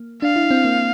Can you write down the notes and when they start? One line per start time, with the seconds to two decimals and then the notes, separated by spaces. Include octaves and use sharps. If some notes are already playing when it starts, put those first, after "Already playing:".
Already playing: A#3
0.22 D4 F5
0.36 E4
0.51 C4
0.65 A#3